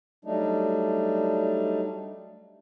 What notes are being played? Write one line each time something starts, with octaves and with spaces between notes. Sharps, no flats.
F#3 G3 A3 D4 D#4